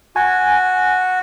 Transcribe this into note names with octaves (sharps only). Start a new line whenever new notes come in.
F#4 G#5